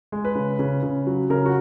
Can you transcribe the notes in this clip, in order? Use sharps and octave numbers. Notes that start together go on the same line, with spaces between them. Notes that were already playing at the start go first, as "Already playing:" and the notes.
G#3
B4
C#3
C#3
C#3
F#3
C#3 A#4
F#4